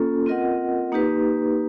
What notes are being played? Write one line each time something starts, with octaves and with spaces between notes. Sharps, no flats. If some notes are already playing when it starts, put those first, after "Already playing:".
Already playing: A#3 C#4 F4 A4
C4 F4 A#4 D#5 F#5
A#3 D#4 G4 B4